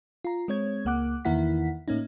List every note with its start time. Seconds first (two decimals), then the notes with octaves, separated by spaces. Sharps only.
0.25 F4 A#5
0.48 G#3 C4 C#5 G#6
0.85 C#2 A#3 F#5 D6 F#6
1.25 E2 D#3 A#3 E4 F#5 B6
1.88 A2 A#3 C#4 D#4